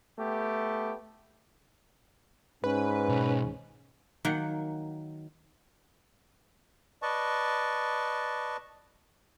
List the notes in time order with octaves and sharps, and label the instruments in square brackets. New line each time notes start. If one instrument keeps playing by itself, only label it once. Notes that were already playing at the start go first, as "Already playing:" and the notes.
[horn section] A3 B3 G4
[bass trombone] G#2 [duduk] C#4 [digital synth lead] B4
[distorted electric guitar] B1
[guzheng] D#3 F#3 A#3 F#5
[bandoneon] B4 D5 D#5 A5 C#6